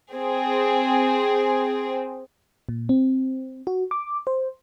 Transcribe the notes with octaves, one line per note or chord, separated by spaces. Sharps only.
C4 G#4
A#2
C4
F#4
D6
C5